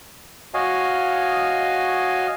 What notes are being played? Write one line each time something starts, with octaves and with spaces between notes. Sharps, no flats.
F#4 C#5 D#5 F5 G#5